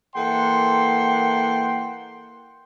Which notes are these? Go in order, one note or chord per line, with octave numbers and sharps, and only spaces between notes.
E3 A#3 A4 F#5 G5 C6